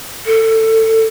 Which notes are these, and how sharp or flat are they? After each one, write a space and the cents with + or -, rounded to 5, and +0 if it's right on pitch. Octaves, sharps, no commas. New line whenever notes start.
A4 +20